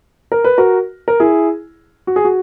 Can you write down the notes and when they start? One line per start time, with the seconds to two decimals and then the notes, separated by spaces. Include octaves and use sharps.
0.32 A#4
0.44 B4
0.58 F#4 A#4
1.08 A#4
1.20 E4 G#4
2.07 F#4
2.16 G#4
2.25 F#4